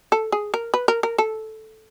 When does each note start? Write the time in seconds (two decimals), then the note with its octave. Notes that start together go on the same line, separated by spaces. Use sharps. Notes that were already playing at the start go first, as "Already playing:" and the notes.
0.12 A4
0.32 G#4
0.54 A#4
0.74 B4
0.88 A#4
1.03 A#4
1.18 A4